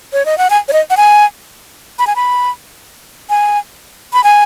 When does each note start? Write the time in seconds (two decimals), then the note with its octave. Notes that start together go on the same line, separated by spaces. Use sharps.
0.13 C#5
0.26 D#5
0.38 F#5
0.50 G#5
0.68 C#5
0.73 D#5
0.90 F#5
0.97 G#5
1.99 B5
2.07 G#5
2.16 B5
3.30 G#5
4.13 B5
4.24 G#5